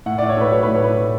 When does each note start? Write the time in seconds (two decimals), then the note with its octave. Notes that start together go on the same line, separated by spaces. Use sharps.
0.06 A2 F#5
0.18 A2 D5
0.29 C#5
0.37 A3 B4
0.52 F#3 C#5
0.63 A2 B4
0.74 C#5
0.82 A2 B4
0.97 A3